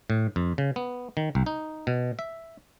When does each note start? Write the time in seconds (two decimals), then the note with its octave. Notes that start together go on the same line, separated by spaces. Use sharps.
0.10 A2
0.36 F2
0.58 C#3
0.76 B3
1.17 D#3
1.35 C2
1.46 D#4
1.87 B2
2.19 E5